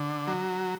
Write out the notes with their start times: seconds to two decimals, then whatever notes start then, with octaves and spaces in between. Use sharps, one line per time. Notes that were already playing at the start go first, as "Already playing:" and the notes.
Already playing: D3
0.27 F#3